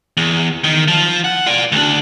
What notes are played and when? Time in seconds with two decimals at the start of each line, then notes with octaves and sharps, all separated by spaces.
0.17 E2
0.64 D#3
0.88 F3
1.24 F#5
1.46 F4 D5
1.72 D2 D4